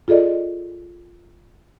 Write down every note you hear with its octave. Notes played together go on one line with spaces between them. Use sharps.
F4 G#4 A4 D5 D#5